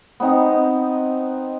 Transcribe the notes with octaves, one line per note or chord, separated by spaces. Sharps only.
B3 C4 D#4